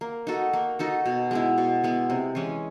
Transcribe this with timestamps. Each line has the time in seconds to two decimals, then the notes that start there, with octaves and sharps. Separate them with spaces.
0.01 A#3
0.27 D#4 F#4 A4
0.53 A#3
0.79 D#4 F#4 A4
1.06 B2
1.31 G#3 B3 E4
1.58 B2
1.84 G#3 B3 E4
2.10 C3
2.35 E3 G#3 C#4